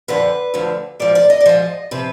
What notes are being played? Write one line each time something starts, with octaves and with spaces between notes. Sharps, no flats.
F2 D3 F3 B4
D2 D3 F3
G#2 F3 D5
D5
D#5
D5
G#2 F3 D#5
C3 F3 B4